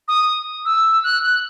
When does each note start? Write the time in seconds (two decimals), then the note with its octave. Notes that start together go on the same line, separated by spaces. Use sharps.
0.08 D#6
0.65 E6
1.04 F#6
1.23 F#6